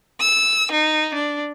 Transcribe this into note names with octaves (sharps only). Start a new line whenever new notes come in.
E6
D#4
D4